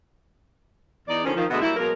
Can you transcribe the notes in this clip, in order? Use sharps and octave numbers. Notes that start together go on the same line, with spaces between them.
E2 D#4 D5
D3 D#3 F3 C4 C#4
D#3 F3
D2 B2 G#3 D#5 E5 F#5
F#3 G3 A#3 E4
B2 F#3 G#3 A#3 A#4